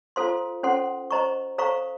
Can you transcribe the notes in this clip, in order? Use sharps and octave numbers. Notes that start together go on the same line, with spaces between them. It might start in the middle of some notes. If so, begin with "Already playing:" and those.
F4 A4 C5 F5 C6
C#4 A4 C5 F#5 C6
C5 D#5 A#5 C#6
A4 C5 F5 A#5 C#6